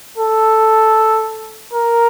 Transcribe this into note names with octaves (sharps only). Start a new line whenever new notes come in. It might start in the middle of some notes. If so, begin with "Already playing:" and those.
A4
A#4